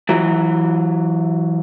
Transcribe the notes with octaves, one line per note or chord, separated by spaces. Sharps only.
E3 F#3